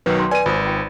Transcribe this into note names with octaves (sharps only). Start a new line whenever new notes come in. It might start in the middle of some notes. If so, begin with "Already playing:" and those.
B1 D#3 F#3 B4 G5
C6
B4 D5 G#5 D#7
G#1 F4 C5 D#6
F4 G5